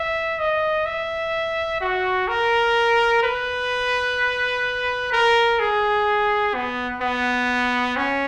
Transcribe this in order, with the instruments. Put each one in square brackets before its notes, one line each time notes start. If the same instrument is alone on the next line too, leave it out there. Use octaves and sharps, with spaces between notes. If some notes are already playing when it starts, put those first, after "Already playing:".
Already playing: [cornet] E5
D#5
E5
F#4
A#4
B4
A#4
G#4
B3
B3
C#4